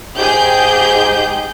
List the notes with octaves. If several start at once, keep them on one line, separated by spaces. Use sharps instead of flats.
G#2 G4 G#4 G6